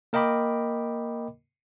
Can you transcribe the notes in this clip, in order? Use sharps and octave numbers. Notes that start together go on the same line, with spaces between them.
A#3 A#4 D#5 G5 B5 D6